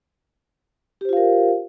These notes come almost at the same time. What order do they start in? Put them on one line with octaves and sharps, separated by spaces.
G4 C5 F4 F5 A#4